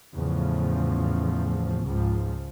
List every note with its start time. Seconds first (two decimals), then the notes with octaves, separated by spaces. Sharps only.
0.14 E2 A2 C#3 F3
1.84 C#2 G#2 F3